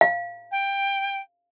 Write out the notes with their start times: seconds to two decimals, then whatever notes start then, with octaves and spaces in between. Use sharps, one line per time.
0.01 F5
0.51 G5